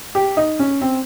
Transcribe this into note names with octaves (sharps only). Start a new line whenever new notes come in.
G4
D#4
C#4
C4